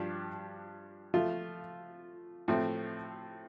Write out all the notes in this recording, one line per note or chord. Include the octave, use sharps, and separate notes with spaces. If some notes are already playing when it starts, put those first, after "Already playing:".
Already playing: G2 F3 D4 G4
F3 A3 F4
A2 F3 A3 C4